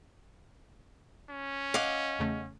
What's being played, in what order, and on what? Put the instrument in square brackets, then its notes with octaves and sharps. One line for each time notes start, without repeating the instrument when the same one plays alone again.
[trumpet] C#4
[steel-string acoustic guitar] D#5 [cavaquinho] F5 F#5 D6
[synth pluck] E2 C#3 A3